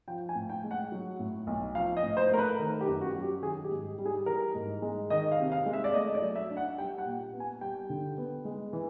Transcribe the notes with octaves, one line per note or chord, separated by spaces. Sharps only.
F3 G5
G#5
A2
G5
G#3
F#5
F#3
A2
B1
F3 F5
D#5
A2
C5
A3 A#4
B4
D#3 A#4
G4
F#2
F#4
F#3
G4
D#3 G#4
G4
G#2
G3
G#4
E3 A#4
G#2
G#3
D#3 D#5
F5
C3
F5
G#3
E5
D5
A3 D#5
D5
F#3
E5
D4
F#5
G3 G5
F#5
A#2
B3
G#5
G3 G5
D3
B3
G#3
E3